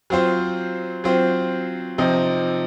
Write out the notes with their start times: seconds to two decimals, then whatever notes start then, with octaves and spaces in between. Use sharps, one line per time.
0.10 F#3 C4 F4 C5
1.04 F#3 C4 F4 C5
1.98 C3 F3 C4 D#4